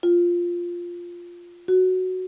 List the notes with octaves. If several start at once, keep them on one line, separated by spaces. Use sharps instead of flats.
F4
F#4